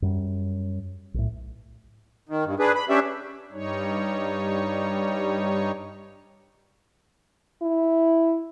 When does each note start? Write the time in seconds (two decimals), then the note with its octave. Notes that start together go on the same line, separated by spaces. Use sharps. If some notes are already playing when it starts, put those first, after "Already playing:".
0.02 F#2 G3
1.14 B1 A2
2.29 D#3
2.45 G2
2.59 D4 G#4 B4
2.75 B5
2.89 C#4 D4 G4 E5
3.52 G2 G3 D#4 C#5
7.62 E4